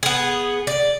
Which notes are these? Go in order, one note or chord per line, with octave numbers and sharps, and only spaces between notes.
B3 G#4
D5